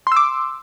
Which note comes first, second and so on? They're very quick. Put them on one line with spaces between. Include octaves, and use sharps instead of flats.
C6 E6 D6